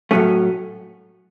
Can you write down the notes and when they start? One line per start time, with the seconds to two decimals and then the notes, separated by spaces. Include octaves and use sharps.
0.11 A2 F#3 A3 C#4